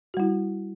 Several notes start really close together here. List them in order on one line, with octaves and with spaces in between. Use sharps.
F#4 G3 E4